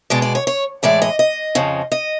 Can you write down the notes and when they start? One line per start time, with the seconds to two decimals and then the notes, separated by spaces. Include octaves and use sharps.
0.10 B2 G#3 B3 D5
0.22 D5
0.35 C#5
0.47 C#5
0.83 A2 E3 G#3 D5
1.02 D#5
1.19 D#5
1.55 F2 C#3 F3
1.92 D#5